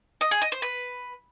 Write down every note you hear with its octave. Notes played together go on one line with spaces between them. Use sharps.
D#5
G#4
D#5
C5
B4